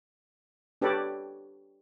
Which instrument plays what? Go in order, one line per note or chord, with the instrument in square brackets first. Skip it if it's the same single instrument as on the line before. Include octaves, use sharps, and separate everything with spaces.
[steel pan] D4 G4 A4 B4 C#5 D5